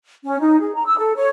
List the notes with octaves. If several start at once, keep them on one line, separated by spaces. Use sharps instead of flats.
C#4
D#4
G#4
A#5
E6
A4
C#5